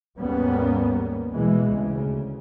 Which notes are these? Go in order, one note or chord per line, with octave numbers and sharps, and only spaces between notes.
D#2 G#2 G3 A#3 B3 C#4
B2 E3 G#3
D2 C#3